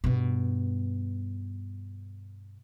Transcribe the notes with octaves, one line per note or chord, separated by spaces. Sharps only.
G2 B2